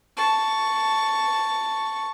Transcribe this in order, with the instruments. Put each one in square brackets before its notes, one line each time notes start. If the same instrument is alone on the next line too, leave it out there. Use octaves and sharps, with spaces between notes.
[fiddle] A5 C#6